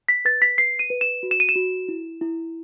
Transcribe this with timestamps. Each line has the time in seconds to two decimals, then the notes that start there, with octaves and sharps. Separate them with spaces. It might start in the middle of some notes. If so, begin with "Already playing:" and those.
0.09 B6
0.25 B4 A6
0.42 B6
0.58 B4 C7
0.79 D#7
0.90 B4
1.01 E7
1.23 F#4
1.31 E7
1.40 D#7
1.49 E7
1.56 F#4
1.89 E4
2.21 E4